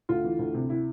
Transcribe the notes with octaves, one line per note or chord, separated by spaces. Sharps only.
D2 F4
E3
D2
C3
E4